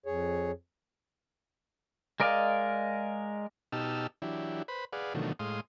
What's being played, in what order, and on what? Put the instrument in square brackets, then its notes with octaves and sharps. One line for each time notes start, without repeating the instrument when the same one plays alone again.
[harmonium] F2 G#4 C#5
[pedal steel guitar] G#3 A#4 D5 D#5 F5
[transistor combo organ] B2 D#4 G4 A5 E6 F6
E3 F#3 D4 E4 G4
B4 C5 B5
G#4 B4 D5 F5 F#5
B2 D3 D#3 F3 F#3 A3
A2 G#3 F5 C6 D#6